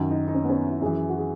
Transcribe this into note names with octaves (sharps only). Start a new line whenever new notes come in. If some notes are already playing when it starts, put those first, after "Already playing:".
Already playing: F#2 D#3 F#4
D#4
D#4
C#4
B3
C#4
E4
F#2 E3 G#4
F#4
G#4